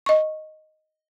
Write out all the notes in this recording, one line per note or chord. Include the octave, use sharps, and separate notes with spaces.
D#5 C#6